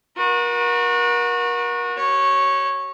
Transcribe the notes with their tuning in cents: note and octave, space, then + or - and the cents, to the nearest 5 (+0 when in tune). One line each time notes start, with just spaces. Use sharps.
F#4 -30 A#4 +35
G4 -45 C#5 -10